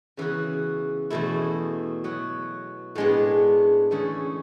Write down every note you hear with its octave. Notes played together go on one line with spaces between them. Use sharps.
C#3 E3 B3 F#4 B4
E2 B2 A3 E4
B2 F#3 B3 F#4
A2 G#3 B3 D4
E2 D3 A3 C#4 G#4